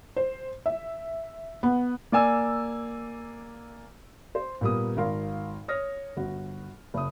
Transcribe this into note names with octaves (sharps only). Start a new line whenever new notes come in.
C5
E5
B3
A#3 D5 G#5 E6
C5
A#2 G3 A#3 B3 D#6
G#1 A#4 F5 C6
C#5 D#6 F6 A#6
G1 F#4
F#1 D#6